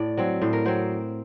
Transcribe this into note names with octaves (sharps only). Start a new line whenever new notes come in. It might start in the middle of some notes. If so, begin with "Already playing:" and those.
Already playing: A2 D5
F#3 C4
A2 C5
A#4
F#3 C4 C5